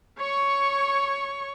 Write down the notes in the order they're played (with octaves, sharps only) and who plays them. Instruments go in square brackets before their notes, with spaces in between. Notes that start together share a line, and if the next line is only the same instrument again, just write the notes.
[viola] C#5 C#6